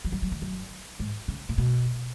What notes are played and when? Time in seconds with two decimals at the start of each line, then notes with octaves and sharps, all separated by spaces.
0.05 F3
0.12 F#3
0.22 F#3
0.32 D#3
0.42 F#2
1.00 G#2
1.28 C#3
1.49 A#2
1.58 B2